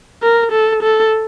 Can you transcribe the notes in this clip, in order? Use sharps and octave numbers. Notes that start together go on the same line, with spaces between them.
A#4
A4
A4